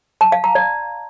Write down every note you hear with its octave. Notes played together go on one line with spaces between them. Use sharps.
A5
F5
A#5
D5